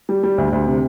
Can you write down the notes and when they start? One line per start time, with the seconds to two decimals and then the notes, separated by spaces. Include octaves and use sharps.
0.09 G3
0.23 G3
0.38 D2
0.53 D2
0.67 C3